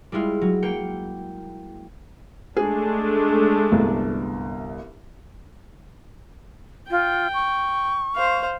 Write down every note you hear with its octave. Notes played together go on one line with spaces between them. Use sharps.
G3 G#3 E4 F4
F#3
A#3 G5 C#7
G#3 A3 D4 G#4
G1 C2
F4 G5
C#6
C5 F5